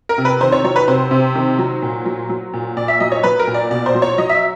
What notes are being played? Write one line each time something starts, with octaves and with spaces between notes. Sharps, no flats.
A#4
C3
B4
D#3 C5
C#5
F#3 C#5
B4
C3 C5
C3
D#3
F#3
A#2
F#3
F#3
A#2
A#2 D5
E5
F#3 D#5
C#5
F#3 B4
A#4
A#2
D5
B2 D5
C5
F#3
C#5
F#3 D#5
E5